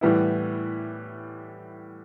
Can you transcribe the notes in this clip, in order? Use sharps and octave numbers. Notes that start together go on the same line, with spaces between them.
A2 E3 G3 B3 E4